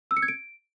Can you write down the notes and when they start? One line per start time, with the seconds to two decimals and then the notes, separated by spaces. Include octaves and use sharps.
0.11 E6
0.17 C#7
0.22 G#6
0.28 D7